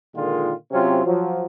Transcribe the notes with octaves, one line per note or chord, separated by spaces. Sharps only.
A#2 D3 D#3 G#3 F4
C3 F#3 C4 C#4 F4
F3 F#3